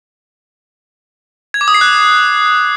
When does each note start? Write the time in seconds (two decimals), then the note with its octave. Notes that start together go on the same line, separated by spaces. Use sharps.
1.54 G#6
1.61 D6
1.68 D#6
1.74 C7
1.81 F#6